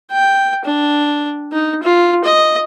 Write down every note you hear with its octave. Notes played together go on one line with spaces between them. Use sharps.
G5
D4
D#4
F4
D#5